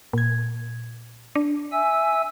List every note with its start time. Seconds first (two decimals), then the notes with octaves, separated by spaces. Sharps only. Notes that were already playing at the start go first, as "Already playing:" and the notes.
0.13 A#2 G#6
1.35 D4
1.72 E5 G#5 E6